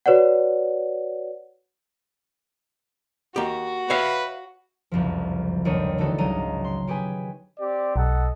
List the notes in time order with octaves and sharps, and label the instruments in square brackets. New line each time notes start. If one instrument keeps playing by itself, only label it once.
[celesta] F#4 B4 C#5 D5 F#5
[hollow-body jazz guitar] A#3 G4 [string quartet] F#4
[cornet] B4 [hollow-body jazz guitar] C#5 E5 F5
[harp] F#1 C2 F2 F3
G1 D#2 D#3 G3 C#5 D#7
D3 E3 A3 D#4 F#4 A4
G#1 C#2 F#3 G#3 A#5 D#7
C6
C#4 G4 G#4 B4 G#5
[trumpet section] C4 G4 D5
[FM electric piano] B1 [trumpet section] A4 D#5 F#5